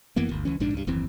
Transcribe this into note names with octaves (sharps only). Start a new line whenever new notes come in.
F2 E3 A#3 B3
G1 D2
C#2 E3 C#4
A#1 G#2 D4
C#2 G2
F#1 D#2 E3 C4